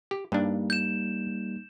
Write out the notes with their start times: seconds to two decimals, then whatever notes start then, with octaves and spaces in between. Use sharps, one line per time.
0.11 G4
0.32 G2 G3 A#3 D4 D#4
0.70 G6 E7